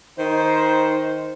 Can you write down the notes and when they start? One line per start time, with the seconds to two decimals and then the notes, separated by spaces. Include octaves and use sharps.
0.19 D#3 D#4 C5